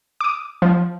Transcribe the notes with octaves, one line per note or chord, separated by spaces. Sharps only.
D6 D#6
F3